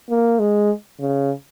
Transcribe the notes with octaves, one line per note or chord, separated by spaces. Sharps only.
A#3
G#3
C#3